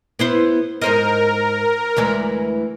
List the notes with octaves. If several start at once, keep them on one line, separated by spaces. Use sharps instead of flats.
B3 E4 C5
G#2 A#4 C5 D#5
D2 E3 G#3